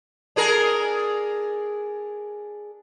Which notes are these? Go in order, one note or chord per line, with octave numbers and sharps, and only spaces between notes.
D4 G#4 A#4